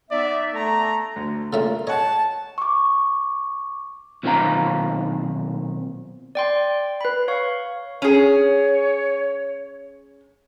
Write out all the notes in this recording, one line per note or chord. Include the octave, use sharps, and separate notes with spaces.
B3 D#4 D5 E5
A3 A#5
D2
C#3 A3 A#3 D4 F4
C#5 D#5 F#5 A5
C#6 D6
B1 A#2 D#3 C4 F5 A#5
D5 G5 C6
B4 B5
C#5 F5 C#6
C#4 G#4 C#5